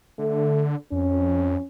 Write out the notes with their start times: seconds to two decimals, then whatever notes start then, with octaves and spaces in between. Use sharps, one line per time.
0.19 D3 A3
0.92 F2 C#4